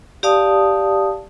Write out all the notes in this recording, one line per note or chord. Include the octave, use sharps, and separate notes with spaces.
G4 D5 F5 A5 D#6